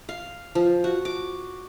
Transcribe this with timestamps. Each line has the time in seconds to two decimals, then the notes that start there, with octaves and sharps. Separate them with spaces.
0.09 F5
0.55 F3
0.84 F#4
1.05 D6